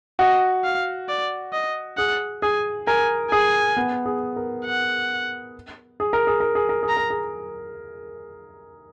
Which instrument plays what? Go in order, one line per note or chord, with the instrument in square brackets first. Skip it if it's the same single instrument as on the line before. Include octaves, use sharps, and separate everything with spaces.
[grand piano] F#4 [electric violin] D#5
[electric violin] F5
D5
D#5
[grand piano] G#4 [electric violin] F#5
[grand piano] G#4 [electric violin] G#5
[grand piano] A#4 [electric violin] G#5
[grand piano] G#4 [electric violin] G#5
[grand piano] B3
G#4
A#4
[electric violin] F#5
[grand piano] G#4
A#4
G#4
A#4
G#4
A#4
G#4
[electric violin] A#5
[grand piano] A#4
G#4